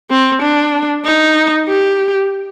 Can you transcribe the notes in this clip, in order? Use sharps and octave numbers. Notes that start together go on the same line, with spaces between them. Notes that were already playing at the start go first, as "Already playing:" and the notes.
C4
D4
D#4
G4